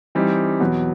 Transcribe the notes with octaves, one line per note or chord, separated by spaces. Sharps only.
E3 G3 C4 D#4 G4
E2 B2 F#3 B3